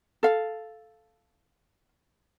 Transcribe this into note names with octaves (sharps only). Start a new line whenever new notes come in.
A4 F5